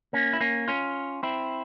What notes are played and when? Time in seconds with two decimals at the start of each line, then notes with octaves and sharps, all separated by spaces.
0.13 A#3 C#4
0.33 E4
0.41 A#3 C#4
0.68 C#4 F4
1.23 C4 E4